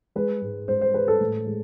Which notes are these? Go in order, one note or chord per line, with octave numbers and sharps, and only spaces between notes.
G#3 B4
G#2
G#2 C5
C5
G#3 B4
A4
A2
G#3